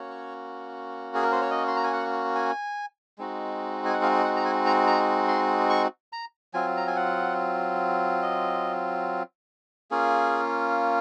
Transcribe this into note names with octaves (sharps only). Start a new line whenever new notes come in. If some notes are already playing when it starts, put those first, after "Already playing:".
Already playing: A#3 C#4 F#4 C#5
G#4
A#4
C5
C#5
D#5
C6
A#5
G#5
F#5
G#5
G#3 C4 D#4 F#4
G#5
F#5
F5
F#5
A#5
G#5
A#5
A#5
C6
C#6
A#5
F#3 C4 F4 G#5
A#5
G#5
F#5
D#5
A#3 C#4 F4 G#4